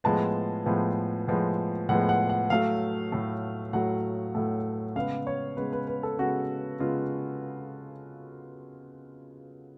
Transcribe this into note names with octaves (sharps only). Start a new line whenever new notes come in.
A2 F3 G#3 B3 A5
A2 F3 G#3 B3
A2 F3 G#3 B3
A2 F3 G#3 B3 F#5
F#5
F#5
A2 F#3 A3 F5
A2 F#3 A3
A2 F#3 A3 F#5
A2 F#3 A3
C#3 G#3 B3 F5
C#5
C#3 G#3 B3 B4
B4
B4
A4
C#3 G#3 B3 F#4
C#3 G#3 B3 F4